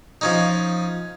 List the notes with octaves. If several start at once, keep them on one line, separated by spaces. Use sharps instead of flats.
F3 C#4 D#4